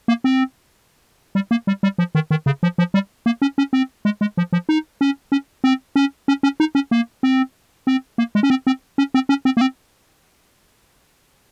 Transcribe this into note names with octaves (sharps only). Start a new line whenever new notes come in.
A#3
C4
G3
A#3
G3
G3
F3
D#3
D#3
C#3
F3
F3
G3
A#3
C#4
C#4
C4
G#3
G#3
F3
F3
D#4
C#4
C#4
C4
C#4
C#4
C#4
D#4
C#4
A#3
C4
C4
A#3
G#3
C#4
C4
C4
C#4
C4
C#4
C4
A#3
C4